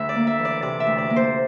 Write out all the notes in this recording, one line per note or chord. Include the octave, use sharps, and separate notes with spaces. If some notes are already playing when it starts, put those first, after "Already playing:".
Already playing: D2 E5
D5
A#3
E5
E3
D5
C3 D5
E5
D2
D5
A#3
C5